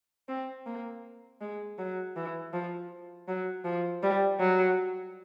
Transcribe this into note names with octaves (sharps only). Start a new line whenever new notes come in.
C4
A#3
G#3
F#3
E3
F3
F#3
F3
G3
F#3